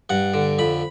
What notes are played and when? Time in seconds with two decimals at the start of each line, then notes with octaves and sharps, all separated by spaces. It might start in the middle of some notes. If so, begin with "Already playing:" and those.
0.10 G2 F#5
0.34 D3
0.59 F2 B5